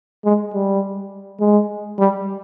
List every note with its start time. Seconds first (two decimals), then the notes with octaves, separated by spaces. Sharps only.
0.25 G#3
0.54 G3
1.40 G#3
1.98 G3